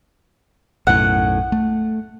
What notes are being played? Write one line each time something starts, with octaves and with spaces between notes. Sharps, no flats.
B1 F#2 A2 F#5
A3